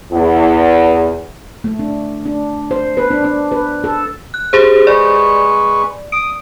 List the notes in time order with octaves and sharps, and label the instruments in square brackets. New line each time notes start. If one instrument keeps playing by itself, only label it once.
[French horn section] E2
[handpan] A3
D4
D4
C5
B4
D4
D4
B4
A4
[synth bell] F#6
G4 G#4 C5
[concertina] G#3 B4 C#6 [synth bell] D5
[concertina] D#6 [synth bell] D7